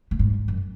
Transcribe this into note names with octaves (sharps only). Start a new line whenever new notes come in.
A2
G#2
F#2